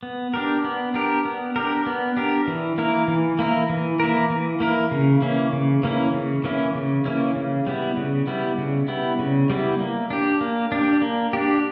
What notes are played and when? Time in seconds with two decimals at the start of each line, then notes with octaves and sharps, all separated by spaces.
0.03 B3
0.34 D4 G4 A#4
0.64 B3
0.94 D4 G4 A#4
1.25 B3
1.56 D4 G4 A#4
1.86 B3
2.17 D4 G4 A#4
2.47 E3
2.78 A#3 E4 A#4
3.08 E3
3.39 A#3 E4 A#4
3.70 E3
4.00 A#3 E4 A#4
4.30 E3
4.60 A#3 E4 A#4
4.91 C#3
5.22 E3 A#3 C#4 E4
5.53 C#3
5.83 E3 A#3 C#4 E4
6.14 C#3
6.44 E3 A#3 C#4 E4
6.75 C#3
7.05 E3 A#3 C#4 E4
7.36 C#3
7.67 G3 B3 E4
7.97 C#3
8.27 G3 B3 E4
8.58 C#3
8.88 G3 B3 E4
9.19 C#3
9.50 G3 B3 E4
9.80 A#3
10.10 D4 G4
10.41 A#3
10.72 D4 G4
11.02 A#3
11.33 D4 G4